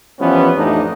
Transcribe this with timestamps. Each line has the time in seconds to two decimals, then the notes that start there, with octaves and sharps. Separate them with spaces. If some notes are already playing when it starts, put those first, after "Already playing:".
0.20 E3 F3 G3 B3 C#4
0.57 A1 F2 A2 E3 D4 D#4